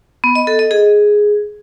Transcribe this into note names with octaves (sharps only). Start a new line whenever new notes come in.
B3
D#5
A4
D#5
G#4